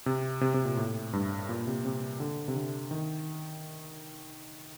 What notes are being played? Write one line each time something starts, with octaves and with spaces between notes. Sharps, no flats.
C3
C3
C3
A#2
A2
G2
A#2
C3
C3
D3
C3
D3
D#3